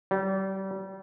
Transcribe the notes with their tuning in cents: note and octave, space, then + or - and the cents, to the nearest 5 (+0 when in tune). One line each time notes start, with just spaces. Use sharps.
G3 -30